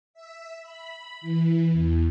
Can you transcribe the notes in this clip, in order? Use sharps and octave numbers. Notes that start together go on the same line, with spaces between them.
E5
B5
E3
E2